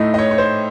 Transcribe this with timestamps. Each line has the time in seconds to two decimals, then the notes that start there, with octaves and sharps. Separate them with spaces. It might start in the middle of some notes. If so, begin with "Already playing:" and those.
Already playing: A2 A3 D#4 D#5
0.14 D#5
0.19 C#5
0.31 C#5
0.38 C5